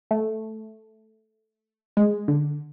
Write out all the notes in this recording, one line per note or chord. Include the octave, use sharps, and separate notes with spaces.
A3
G#3
D3